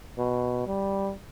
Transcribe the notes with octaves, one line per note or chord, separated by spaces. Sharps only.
B2
G3